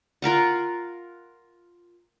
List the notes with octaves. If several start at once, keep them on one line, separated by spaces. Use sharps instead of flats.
F4 A#4 F5 F#5